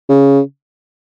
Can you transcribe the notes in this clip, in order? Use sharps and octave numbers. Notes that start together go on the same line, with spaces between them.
C#3